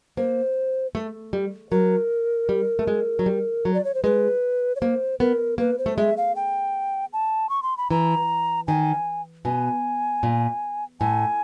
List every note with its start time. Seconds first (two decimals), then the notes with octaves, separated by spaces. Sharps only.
0.17 A#3 C5
0.95 A3
1.33 G3
1.71 F#3 A#4
2.49 G3
2.79 A3
2.87 G#3
3.19 F#3
3.26 G3
3.65 F#3
3.74 D5
3.85 C#5
3.95 C5
4.03 G#3 B4
4.76 C#5
4.81 A#3 C5
5.20 B3 A#4
5.58 A#3 B4
5.78 C5
5.86 A3
5.97 G#3 E5
6.17 F5
6.36 G5
7.13 A5
7.49 C#6
7.63 C6
7.77 B5
7.91 E3 A#5
8.67 D#3 G#5
9.45 B2 G#5
10.23 A#2
11.00 A2 G#5